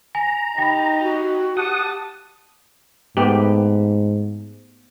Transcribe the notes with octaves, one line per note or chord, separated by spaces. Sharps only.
G#5 A#5
D#4 G4 G5 B5
F#4
G4 F#5 A5 D#6
G#2 A3 B3 G4